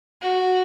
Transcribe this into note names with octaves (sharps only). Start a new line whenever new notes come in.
F#4